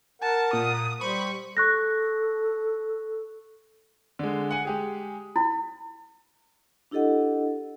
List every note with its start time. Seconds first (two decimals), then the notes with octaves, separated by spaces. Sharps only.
0.22 A#4 F#5 A5
0.53 A#2 D#6
1.01 G3 C5 B5 C#6
1.57 A4 C#6 F#6 A#6
4.19 D3 G#3
4.51 F#5 G#5
4.65 G#3 G4 G#4
5.36 E4 B5
6.91 D4 E4 G4 A4 D#5 F#5